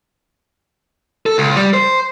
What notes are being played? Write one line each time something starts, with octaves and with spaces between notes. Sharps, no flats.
A4
C#2
G3
C5